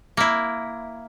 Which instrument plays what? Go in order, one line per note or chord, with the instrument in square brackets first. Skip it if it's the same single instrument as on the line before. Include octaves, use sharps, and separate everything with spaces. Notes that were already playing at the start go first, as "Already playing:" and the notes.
[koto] A#3 E4